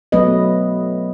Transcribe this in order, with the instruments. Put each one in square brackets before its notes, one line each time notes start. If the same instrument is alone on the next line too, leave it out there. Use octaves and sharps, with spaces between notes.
[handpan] F#3 A3 B3 B4 D#5